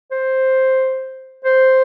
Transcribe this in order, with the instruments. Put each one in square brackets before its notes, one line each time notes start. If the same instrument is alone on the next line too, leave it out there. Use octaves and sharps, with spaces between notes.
[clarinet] C5
C5